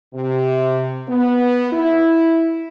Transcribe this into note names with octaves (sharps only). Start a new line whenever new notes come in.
C3
B3
E4